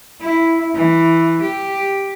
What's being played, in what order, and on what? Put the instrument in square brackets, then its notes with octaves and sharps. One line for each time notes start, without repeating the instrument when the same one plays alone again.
[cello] E4
E3
G4